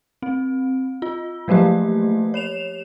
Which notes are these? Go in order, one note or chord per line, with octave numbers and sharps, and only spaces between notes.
C4
F4
F3 F#3 A3 A#3 G4
C#5 E7 F7